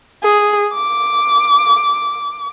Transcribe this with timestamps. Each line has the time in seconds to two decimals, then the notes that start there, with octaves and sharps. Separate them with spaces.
0.23 G#4
0.74 D6